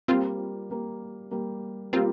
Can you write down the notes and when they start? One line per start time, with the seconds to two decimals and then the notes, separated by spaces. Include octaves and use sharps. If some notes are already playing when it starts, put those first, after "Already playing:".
0.08 G3 A#3 C4 F4 G4 A#4
0.70 G3 A#3 G4 A#4
1.31 G3 A#3 G4 A#4
1.93 G3 A#3 C4 F4 G4 A#4